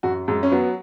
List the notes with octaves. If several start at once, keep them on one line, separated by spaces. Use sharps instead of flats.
F#2 F#4
F#2 G#3
C#4
F#3 B3